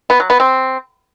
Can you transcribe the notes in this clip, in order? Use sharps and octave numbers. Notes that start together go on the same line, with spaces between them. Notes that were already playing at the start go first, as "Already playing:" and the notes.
B3
F#3
B3
C4